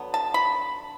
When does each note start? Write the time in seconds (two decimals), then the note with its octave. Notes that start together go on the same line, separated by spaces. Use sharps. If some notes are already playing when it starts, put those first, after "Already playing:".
Already playing: D3 F#3 B3
0.14 A5
0.34 B5